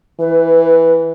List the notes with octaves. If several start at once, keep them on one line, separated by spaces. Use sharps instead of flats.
E3 B4